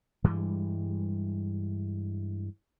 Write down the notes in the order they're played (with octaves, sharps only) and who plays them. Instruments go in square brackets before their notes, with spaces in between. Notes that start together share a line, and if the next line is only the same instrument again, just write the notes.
[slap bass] G2 E3 G3 G#3